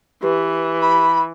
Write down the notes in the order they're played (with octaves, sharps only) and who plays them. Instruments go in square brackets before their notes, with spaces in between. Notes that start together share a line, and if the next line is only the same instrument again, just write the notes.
[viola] E3 [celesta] G4 B4
[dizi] B5